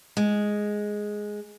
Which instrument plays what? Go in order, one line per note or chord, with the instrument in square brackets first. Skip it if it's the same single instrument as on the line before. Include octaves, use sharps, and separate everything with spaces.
[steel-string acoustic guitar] G#3